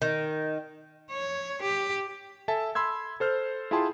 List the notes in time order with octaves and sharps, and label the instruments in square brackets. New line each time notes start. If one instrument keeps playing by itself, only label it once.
[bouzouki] D#3
[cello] C#5
G4
[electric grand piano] A4 E5 G#5 A5
B5 C6 E6 G#6
A4 C5 F6 G6
E4 F4 G#4 G5 A5 C6